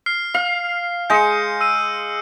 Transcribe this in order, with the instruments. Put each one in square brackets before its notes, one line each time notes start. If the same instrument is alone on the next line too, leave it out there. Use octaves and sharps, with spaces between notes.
[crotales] F6 C7
[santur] F5
[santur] G#3 D#5 [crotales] G6 C#7
[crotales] E6 D#7